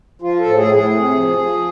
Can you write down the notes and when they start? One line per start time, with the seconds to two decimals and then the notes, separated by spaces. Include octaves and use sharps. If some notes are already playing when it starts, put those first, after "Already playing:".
0.22 F3 F4
0.39 A4
0.46 A2
0.57 G#4
0.69 A2
0.74 G#4
0.93 C3
1.16 F3
1.39 F3